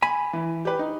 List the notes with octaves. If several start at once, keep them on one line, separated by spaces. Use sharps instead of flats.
G#5 B5
E3
G4 B4
D#4